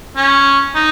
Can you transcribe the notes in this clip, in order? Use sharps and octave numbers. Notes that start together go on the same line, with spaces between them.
C#4
D#4